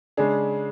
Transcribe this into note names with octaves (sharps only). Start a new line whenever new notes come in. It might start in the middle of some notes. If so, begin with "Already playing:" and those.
C#3 G#3 D4 G#4